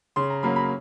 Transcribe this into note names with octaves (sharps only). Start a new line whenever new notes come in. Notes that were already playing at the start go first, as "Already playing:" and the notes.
C#3 C6
A#5
F#3 A#3 C#4 B5
B5